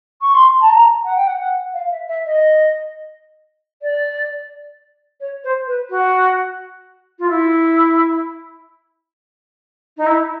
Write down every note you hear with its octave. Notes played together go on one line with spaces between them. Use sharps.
C#6
C6
A5
A#5
F#5
G5
F#5
F#5
F5
E5
E5
D#5
D5
C#5
C5
B4
F#4
F4
E4
D#4
E4